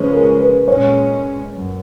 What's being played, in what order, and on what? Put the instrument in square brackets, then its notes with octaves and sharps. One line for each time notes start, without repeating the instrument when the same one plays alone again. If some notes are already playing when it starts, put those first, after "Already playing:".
Already playing: [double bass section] C#3 F3 G#3 C#4 [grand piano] B4 C#5
[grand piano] A#4
B4
[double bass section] A#2 G#3 C#4 [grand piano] C#5
[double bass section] F#2